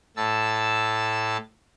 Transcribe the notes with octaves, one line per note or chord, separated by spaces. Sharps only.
A2 A5 E6